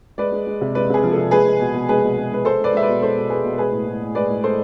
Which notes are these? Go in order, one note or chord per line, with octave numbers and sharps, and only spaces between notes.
G#3 B4 D5
G#3
G#3
C3
G#3 B4 D5
C3 G#4 B4
F3
C3 A4
G#3 G#4 B4
G#3
B2
B2
G#3 G#4 B4
B2
G#3
G#3 B4
G#3 A4 C5
G#3
B4 D5
G#3 E5
B4 D5
B2
G#3 A4 C5
B2
G#3 G#4 B4
B2
G#3 G#4 B4
A2
A2
A2
G#3 B4 D5
A2
G#3 A4 C5